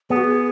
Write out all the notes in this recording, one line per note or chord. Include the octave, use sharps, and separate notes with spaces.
B3 G#4
F#4
G#4